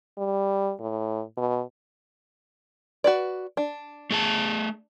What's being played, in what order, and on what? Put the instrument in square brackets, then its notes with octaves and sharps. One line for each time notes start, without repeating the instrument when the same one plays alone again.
[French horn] G3
A2
B2
[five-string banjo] F#4 B4 D5
D4
[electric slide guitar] A3 G#4 A5